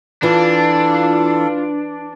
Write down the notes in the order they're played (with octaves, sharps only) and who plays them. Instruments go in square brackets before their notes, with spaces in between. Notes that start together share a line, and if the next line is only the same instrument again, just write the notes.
[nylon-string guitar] E3 [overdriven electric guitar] D4 [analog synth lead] F4 [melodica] A4